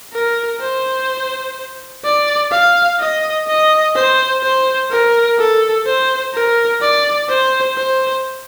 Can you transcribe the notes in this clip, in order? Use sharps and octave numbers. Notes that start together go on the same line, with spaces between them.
A#4
C5
D5
F5
D#5
D#5
C5
C5
A#4
A4
C5
A#4
D5
C5
C5